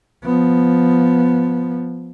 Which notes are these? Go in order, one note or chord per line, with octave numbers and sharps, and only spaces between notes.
F3 B3